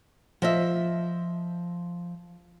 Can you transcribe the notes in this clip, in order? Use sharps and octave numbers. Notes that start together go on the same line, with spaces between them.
F3 D#5 E5